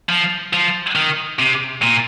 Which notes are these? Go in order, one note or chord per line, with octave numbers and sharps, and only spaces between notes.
F3
F3
D#3
C3
A#2